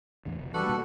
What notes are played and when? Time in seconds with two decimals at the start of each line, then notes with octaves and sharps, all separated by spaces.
0.25 E2 A2 D3
0.39 F1 B2
0.54 E3 G3 D4 F#4 A4 B4
0.66 B2 A#3